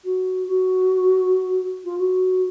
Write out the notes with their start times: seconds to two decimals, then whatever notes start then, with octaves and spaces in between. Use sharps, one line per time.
0.04 F#4
0.47 F#4
1.84 F4
1.98 F#4